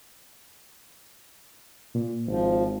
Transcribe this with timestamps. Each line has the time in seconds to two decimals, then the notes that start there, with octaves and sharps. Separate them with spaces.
1.95 A#2
2.27 G#1 F3